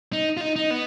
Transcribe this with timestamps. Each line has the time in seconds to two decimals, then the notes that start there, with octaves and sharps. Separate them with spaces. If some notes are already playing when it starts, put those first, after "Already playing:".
0.13 D#4
0.37 F4
0.41 D#4
0.56 D#4
0.71 B3